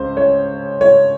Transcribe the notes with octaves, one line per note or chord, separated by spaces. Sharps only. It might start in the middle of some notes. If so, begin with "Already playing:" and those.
Already playing: C#2 C5
C#5
C#5